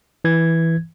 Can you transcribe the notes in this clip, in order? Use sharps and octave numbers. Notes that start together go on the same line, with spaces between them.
E3 G#6